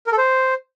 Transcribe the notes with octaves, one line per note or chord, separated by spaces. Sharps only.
A#4
A4
C5